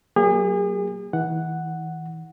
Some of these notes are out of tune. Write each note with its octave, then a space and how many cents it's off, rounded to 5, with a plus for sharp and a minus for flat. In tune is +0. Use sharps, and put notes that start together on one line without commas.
F#3 +15 A#3 -15 G#4 -40
E3 -35 F#5 +0